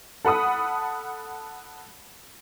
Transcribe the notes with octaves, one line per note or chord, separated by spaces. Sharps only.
A4 F#5 B5 D#6